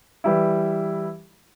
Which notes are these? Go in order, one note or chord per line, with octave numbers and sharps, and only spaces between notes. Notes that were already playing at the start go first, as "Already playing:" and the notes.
E3 G3 E4